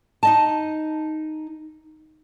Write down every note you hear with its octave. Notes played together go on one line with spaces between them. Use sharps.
D#4 D#5 A5